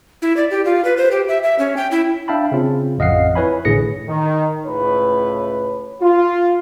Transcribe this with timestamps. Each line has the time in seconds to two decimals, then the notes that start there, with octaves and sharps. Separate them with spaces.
0.22 E4
0.37 D5
0.51 G4
0.65 F4
0.85 B4
0.97 C5
1.11 G4
1.28 E5
1.43 E5
1.59 C#4
1.77 G5
1.91 E4
2.28 D4 E5 F5 G5 A5 B5
2.52 C#3 C4 C#4 F4
2.98 A1 F2 D#5 F5 F#5 C7
3.35 E4 B4 C#5 G#5 B5
3.65 A1 A2 D3 G#4 A#6 C#7
4.08 D#3
4.66 C#2 A2 B4 C#5
6.02 F4